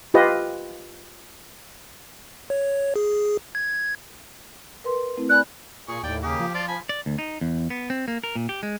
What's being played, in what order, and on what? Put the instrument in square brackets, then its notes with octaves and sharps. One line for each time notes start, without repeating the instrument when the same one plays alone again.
[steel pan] F4 G4 B4 D#5
[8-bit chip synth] C#5
G#4
G#6
[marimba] A#4 B4 C6
A3 C4 E4
[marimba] D5 G#5 B5 [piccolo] F#6
[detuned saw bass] A#2 [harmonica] G#4 C#6
[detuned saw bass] D#2 [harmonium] A2 [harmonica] D5 G5
[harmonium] C#3 A#3 G#4 [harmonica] G4
[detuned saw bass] F3
[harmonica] F4 D5 [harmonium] A5
[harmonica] G#5 B5
[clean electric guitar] D5
D2
D#4
E2
B3
C4
A#3
A#4
A#2
G4
G#3